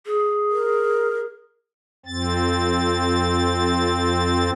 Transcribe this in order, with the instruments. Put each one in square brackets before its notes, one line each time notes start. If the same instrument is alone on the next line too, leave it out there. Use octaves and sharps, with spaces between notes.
[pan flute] G#4
[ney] A#4
[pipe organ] F2 C4 A6